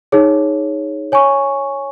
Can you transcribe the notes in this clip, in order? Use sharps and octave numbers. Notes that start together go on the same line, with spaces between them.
D#4 G#4 C#5
C#5 G#5 C#6